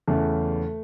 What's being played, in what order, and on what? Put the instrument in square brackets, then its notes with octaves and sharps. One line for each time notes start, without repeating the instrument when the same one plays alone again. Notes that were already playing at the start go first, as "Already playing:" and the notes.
[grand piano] E2 C#3 E3 A3